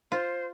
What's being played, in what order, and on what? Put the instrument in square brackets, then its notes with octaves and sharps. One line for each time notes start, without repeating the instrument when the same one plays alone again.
[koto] F4 [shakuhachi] C5